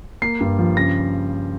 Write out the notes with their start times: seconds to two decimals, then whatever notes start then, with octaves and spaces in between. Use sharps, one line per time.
0.22 A#3 C7
0.41 G2
0.59 F3
0.77 C#3 A#6